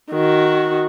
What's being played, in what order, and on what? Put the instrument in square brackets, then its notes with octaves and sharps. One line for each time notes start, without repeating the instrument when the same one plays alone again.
[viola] D#3 F#4